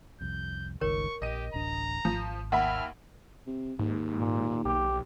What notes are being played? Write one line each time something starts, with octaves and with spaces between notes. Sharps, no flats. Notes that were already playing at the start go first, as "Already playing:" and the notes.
C2 F2 G6
G1 C#2 D#3 A#4 C#5 C#6
A#1 G4 D#5 D#7
D1 A1 D4 A#5
G#1 F3
D#2 E5 F#5 B5 F6
C3
D#2 G#2
A#2
B1 G4